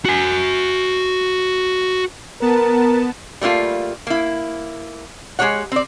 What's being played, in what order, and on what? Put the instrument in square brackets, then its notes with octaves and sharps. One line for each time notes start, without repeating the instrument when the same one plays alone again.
[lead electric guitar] F#4 G#5
[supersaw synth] B3 A5 [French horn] A#4
[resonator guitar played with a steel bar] G3 A3 A#3 F4
A#3 E4
G#3 A#3 G4 C#5 F#5
C4 D5